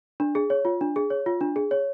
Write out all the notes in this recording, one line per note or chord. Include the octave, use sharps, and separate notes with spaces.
D4
G#4
C#5
F4
D4
G#4
C#5
F4
D4
G#4
C#5